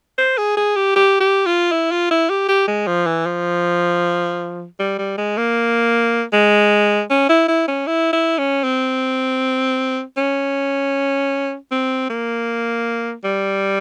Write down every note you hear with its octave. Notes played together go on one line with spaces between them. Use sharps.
C5
G#4
G#4
G4
G4
G4
F4
E4
F4
E4
G4
G4
G#3
F3
E3
F3
G3
G3
G#3
A#3
G#3
C#4
E4
E4
C#4
E4
E4
C#4
C4
C#4
C4
A#3
G3